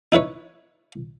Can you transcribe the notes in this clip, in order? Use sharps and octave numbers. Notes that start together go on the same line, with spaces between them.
D#4 E4 B4 C#5